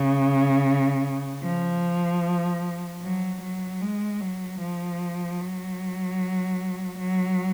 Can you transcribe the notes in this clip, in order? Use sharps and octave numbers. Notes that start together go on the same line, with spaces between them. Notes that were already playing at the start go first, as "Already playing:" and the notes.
Already playing: C#3
F3
F#3
F#3
G#3
F#3
F3
F#3
F#3